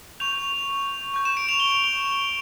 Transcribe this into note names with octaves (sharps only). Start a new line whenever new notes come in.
C#6 G6 F7
C#6 G6 F7
E7
D7
F7
G7
G7